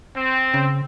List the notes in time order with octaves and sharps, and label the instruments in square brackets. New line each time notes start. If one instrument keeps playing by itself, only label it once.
[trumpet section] C4
[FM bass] C#3